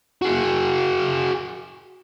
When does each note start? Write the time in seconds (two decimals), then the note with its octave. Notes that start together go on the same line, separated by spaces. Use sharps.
0.22 F#4 G#4